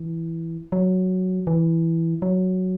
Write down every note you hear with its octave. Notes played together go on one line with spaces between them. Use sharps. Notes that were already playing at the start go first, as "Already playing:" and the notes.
Already playing: E3
F#3
E3
F#3